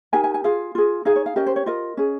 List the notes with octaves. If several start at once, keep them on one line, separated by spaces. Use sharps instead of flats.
D#4 G4 A#4 G#5
G#5
G#5
F4 G#4 F5
F4 G#4
D#4 G#4 F5
C#5
F5
C#4 G4 A#4 D#5
C5
C#5
F4 A#4 D#5
C#4 G#4